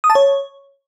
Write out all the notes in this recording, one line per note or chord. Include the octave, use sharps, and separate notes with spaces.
D#6
A5
C#5